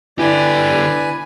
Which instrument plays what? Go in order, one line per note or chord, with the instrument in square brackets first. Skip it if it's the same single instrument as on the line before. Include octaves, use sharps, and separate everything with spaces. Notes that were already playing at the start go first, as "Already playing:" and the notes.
[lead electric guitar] D3 G4 [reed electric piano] E4 [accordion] B4 G#5 [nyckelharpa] D5